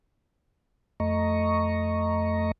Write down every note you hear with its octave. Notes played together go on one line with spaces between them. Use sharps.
F2 A3 D#5 A#5 C#6